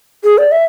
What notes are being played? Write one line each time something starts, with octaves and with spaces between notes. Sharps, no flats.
G#4
D5
E5